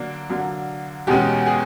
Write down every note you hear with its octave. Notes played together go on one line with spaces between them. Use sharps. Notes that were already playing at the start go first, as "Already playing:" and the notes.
Already playing: D3 F#3 A#3 D4
D3 F#3 A#3 D4
E2 B2 G#3 C#4 G4
G#4